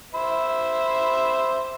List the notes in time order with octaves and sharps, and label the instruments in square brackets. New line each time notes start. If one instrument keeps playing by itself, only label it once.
[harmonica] C5 E5 B5